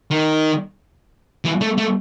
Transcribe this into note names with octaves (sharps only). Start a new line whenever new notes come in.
D#3
E3
A3
A3